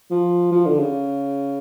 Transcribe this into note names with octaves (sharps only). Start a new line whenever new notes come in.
F3
F3
D3
C#3